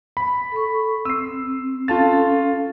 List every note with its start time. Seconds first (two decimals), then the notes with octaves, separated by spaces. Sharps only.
0.17 B5
0.52 A4 C#6
1.05 C4 E6 C7
1.88 C#4 F4 A4 F5 A5 A6